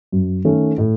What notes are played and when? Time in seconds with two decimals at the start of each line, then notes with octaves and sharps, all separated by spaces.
0.12 F#2
0.45 D#3 A3 C#4
0.78 A2